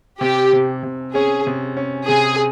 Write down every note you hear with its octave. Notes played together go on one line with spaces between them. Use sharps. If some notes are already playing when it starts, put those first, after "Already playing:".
C3 G4
C3
C3
C#4 G#4
C3
C#4
C3 G#4